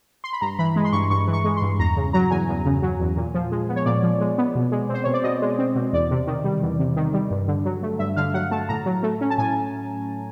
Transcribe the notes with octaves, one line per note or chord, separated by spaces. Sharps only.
C6
B5
G2 A#5
E3 B5
G#3
C6
G2 C#6
G2 C#6
E3
C#6
G#3
C6
G2
E2 A#5
C#3
F#3 A#5
E2 G#5
E2
C#3
F#3
E2
A#2
F3
G#3
B3
C#5
A#2 D5
F3
G#3
B3
B2
G#3
C4
C5
B2 C#5
D5
B2 D#5
G#3
C4
B2
E2 D5
C3
D#3
G3
E2
C3
D#3
G3
G2
D3
F#3
A3
G2 E5
D3 F5
F#3 F#5
A3 A5
A2 A#5
F#3
A3
C#4
A5
A2 G#5